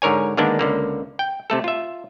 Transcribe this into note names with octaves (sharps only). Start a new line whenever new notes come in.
G#2 D3 A#4 C#5 G#5
D3 D#3 G#3 A#3 B3 D4
C#2 D3 A#3
G5
C3 A3 A4
F4 E5